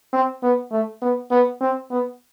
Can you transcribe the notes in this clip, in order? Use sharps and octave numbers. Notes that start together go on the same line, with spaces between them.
C4
B3
A3
B3
B3
C4
B3